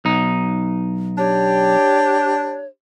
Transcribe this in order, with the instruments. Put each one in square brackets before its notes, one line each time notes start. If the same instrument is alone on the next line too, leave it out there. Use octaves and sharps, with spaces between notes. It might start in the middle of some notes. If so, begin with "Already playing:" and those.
[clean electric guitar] B1 D#4
[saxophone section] D4 G4 [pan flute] C#5